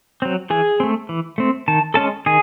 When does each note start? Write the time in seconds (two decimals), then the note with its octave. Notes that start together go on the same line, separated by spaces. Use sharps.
0.22 F#3 C4
0.50 E3 G#4 G#5
0.80 A3 C4
1.09 E3
1.38 A3 C4
1.68 D#3 A5
1.94 G#3 C#4 A4 A5
2.26 D#3 G#4 G#5